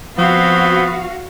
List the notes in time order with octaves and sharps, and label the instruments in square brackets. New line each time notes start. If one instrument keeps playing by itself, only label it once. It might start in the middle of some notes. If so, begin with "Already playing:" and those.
[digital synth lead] F3 [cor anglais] B3 [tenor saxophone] C4 [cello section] F#4 F5